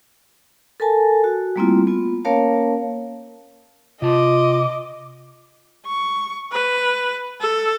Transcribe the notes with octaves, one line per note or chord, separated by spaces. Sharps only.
A4 A#4 G#5 A5
F#4
G3 A3 A#3 C4 E4 F4
B3 F4
A#3 C#4 A#4 C#5 F5 A5
C3 F4 D#5 A5 D6
C#6
B4
A4